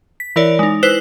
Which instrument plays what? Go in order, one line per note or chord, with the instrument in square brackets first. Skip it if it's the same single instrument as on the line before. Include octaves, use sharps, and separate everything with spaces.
[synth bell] B6
E3 E4 A#4 C#5 D5
G#3 D#4
E4 B4 C5 F#6 E7 F#7